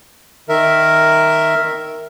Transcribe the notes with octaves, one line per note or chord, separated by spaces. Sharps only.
D#3 A#4 E5